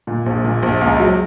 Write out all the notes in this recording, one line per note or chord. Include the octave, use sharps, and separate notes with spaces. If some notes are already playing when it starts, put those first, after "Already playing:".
A#2
A#1
A#2
A#1
C#2
F#3